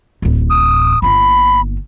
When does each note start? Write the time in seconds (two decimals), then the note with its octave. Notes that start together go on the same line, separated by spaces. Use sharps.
0.22 D1 A1
0.50 D#6
1.02 G1 A#3 B5